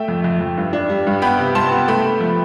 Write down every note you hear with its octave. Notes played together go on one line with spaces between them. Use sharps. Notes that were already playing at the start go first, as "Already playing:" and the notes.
Already playing: A3 E5 G5
F2
F2
F2
G2
D4
G3
G2
B3 G5 B5
C3
G3 A5 C6
B3
A3 G5 B5
A3
F3